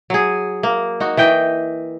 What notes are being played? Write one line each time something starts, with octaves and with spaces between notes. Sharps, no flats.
F#3 G#4
A#3
D#4 F#4
E3 D#5 G5